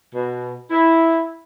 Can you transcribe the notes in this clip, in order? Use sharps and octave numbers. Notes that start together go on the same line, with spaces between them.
B2
E4